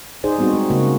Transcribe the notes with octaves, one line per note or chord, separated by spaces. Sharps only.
D#4 G#4 C5 D5
G3 B3 C4 D#4 F#4
G#3
C#3 A#3 F#4